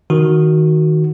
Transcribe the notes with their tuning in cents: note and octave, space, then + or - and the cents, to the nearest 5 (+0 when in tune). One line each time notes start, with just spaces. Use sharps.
D#3 +5 F#4 +0